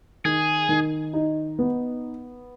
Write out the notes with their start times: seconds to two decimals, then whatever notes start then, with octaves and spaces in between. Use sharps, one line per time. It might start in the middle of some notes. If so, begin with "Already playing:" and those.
0.25 D#3 G#4
0.69 D#3
1.13 D#4
1.59 B3